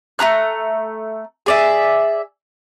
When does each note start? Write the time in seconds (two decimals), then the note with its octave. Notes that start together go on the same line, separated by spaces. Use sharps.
0.19 A3 G#4 A#5 F#6
1.46 G#4 D5 E5